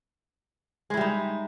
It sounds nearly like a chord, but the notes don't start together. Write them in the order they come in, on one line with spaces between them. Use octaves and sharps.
G#3 E4 G3 D#4